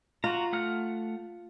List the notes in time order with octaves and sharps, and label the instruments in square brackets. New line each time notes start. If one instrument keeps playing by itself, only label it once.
[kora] F4 [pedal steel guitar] F#4 A#5
[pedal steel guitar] A3 F#5 F6